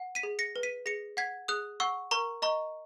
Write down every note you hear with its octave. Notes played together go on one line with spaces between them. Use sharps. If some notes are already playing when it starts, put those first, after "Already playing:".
Already playing: F#5
B6 D#7
G#4
A#6 C#7
B4
B6 D#7
G#4 A#6 C#7
F#5 G#6 B6
G#4 D#6 F#6
F#5 C#6 E6
A#4 A#5 C#6
D#5 A#5 C#6